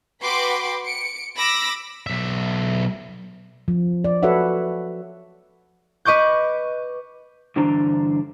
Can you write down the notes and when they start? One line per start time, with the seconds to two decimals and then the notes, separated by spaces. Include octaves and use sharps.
0.22 F#4 B4 G5 B5 C6 D6
0.86 C#7 D7
1.38 B5 D6 E6 A#6
2.07 B1 E5
3.68 F3
4.04 D5
4.23 F#4 A4 B4 C#5 E5 F#5
6.05 B4 D#5 C#6 D6 G6
7.56 G2 D3 E3 D4 C5 A#5